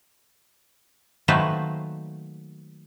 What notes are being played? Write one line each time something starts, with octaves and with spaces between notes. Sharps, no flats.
D#3 F#3 A3 A#3 B4 C5